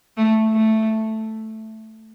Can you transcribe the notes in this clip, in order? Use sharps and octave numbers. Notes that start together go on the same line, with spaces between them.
A3
A3